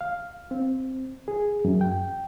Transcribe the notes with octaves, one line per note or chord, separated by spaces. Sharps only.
F5
C4
G#4
F#2
G5